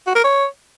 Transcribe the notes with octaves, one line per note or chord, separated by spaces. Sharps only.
F#4
A#4
C#5